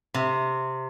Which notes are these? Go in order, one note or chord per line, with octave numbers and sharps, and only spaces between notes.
C3